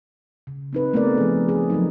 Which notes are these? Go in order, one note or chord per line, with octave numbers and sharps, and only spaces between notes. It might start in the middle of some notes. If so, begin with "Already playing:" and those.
C#3
C4 D#4 B4
A3 B3 C4 G#4 A#4 D5
F3 G#4
G#4
F3 F#3 D#4